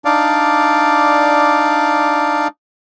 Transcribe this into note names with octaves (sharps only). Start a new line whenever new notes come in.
D4 D#4 D5 F5